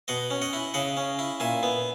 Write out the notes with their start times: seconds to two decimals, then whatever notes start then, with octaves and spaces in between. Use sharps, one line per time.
0.08 B2 D#5 F#5
0.30 C#4
0.42 D#5 F#5
0.53 E4
0.74 C#3 D#5 F#5
0.97 C#4
1.19 E4
1.40 A#2 E5 G#5
1.63 B3